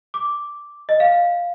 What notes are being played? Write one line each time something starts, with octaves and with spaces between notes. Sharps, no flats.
D6
D#5
F5